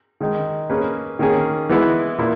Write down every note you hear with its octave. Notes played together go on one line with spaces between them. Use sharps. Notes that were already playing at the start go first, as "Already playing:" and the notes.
D#3 G#3 D#4
A#3 C#4 G#4 B4
D#3 A#3 C#4 G#4
E3 G#3 B3 E4 B4
A#2 A#3 E4